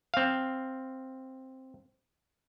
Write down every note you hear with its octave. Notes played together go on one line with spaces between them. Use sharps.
C4 F5